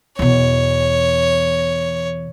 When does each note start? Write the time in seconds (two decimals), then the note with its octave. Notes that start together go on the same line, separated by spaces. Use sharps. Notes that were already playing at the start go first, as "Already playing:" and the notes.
0.19 E2 B2 C#5